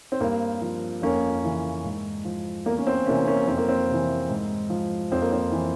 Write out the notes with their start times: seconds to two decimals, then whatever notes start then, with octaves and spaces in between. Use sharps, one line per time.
0.12 C4
0.20 G2 A#3
0.62 F3
1.02 F2 A#3 C#4
1.44 C#3 E3
1.84 G#2
2.25 F3
2.66 E2 A#3
2.78 C#4
2.87 C4
3.06 C3 E3 A#3 C#4
3.27 A#3 C#4
3.47 F2 C4
3.57 A#3
3.69 C4
3.89 C3 E3
4.30 G#2
4.70 F3
5.12 F2 C4
5.21 A#3
5.33 C4
5.51 E3